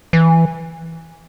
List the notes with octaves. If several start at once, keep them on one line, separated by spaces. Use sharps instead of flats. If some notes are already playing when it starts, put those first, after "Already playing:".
E3